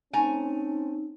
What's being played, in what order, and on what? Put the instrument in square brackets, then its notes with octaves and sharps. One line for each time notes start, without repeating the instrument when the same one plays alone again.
[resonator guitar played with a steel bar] A3 G#5 A#5 [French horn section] C4 C#4 [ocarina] D#4